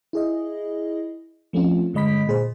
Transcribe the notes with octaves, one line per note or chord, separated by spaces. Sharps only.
E4 G#4 D#5
F3 A3 C4 C#4 F4
G2 D3 G#3 D#5 B5 B6
A#2 G#4 C5